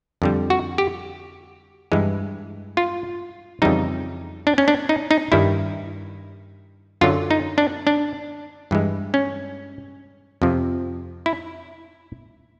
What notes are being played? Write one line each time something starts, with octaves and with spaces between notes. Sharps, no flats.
F2 D3 G3
F#4
G4
G2 E3 G#3
F4
F2 C#3 E3 G3 D#4
D4
C#4
D4
D#4
D#4
G2 D#3 G3 E4
F#2 D3 F#3 F4
D#4
D4
D4
G2 E3 G#3
C#4
F2 C3 F3
E4